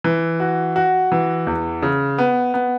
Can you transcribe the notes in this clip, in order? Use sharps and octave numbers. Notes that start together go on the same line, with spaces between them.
E3
F#4
F#4
E3
E2
C#3
B3
B3